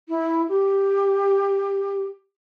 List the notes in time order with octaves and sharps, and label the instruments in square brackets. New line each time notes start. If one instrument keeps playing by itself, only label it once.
[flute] E4
G4